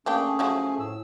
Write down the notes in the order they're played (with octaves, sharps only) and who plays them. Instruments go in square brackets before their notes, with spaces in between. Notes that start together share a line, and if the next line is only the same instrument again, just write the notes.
[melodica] A3 G#4 [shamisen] A#3 D4 G4 [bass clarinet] C#4
[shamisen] F3 F#3 E4
[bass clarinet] A2 [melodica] E6